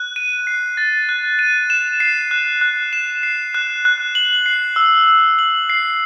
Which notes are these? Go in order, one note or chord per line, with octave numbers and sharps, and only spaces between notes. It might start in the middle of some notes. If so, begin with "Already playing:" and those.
Already playing: F#6
D#7
C7
A6
F#6
D#7
E7
C7
F#6
F#6
E7
C7
F#6
F#6
F#7
C7
E6
E6
F#7
C7